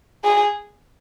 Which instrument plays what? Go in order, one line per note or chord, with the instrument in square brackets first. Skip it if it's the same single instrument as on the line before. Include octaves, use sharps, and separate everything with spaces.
[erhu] G#4